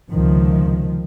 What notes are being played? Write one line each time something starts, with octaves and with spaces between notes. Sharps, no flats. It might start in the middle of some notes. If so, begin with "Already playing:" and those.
C#2 C3 D#3 F3